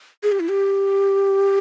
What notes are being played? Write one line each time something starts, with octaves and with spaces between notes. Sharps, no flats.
G#4
G4
E4
G4